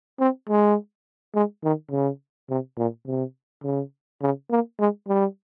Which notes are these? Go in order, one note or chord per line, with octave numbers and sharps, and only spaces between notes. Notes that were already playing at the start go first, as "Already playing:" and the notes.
C4
G#3
G#3
D#3
C#3
C3
A#2
C3
C#3
C#3
A#3
G#3
G3